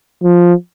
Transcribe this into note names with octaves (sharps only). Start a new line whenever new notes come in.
F3